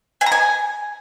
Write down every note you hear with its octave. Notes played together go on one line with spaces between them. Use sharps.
G#5
A#5
G#5